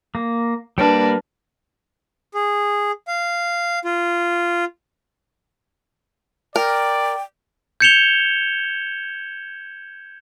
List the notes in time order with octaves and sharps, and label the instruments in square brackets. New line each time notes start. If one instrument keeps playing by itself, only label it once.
[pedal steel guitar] A#3
[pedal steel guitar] G3 A#3 A#4 [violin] D4 B4
[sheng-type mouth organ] G#4
F5
F4
[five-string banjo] A#4 [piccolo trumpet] D5 [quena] G5
[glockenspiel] G6 G#6 C#7 E7 F7 G7